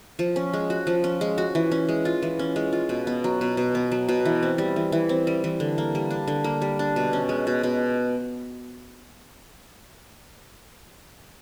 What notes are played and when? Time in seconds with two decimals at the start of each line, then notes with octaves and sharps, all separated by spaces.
0.19 F3
0.36 C#4
0.53 G#3
0.70 F#4
0.87 F3
1.04 C#4
1.21 G#3
1.38 F#4
1.55 E3
1.72 C#4
1.89 G#3
2.05 F4
2.23 E3
2.39 C#4
2.56 G#3
2.73 F4
2.89 B2
3.07 B3
3.24 F#3
3.41 B2
3.57 B2
3.75 B3
3.92 F#3
4.09 B2
4.25 E3
4.43 C4
4.58 G3
4.76 E3
4.92 E3
5.09 C4
5.27 G3
5.44 E3
5.60 D3
5.78 A#3
5.95 G3
6.11 D4
6.28 D3
6.44 A#3
6.62 G3
6.79 D4
6.96 B2
7.13 C#4
7.29 G#3
7.47 B2
7.63 B2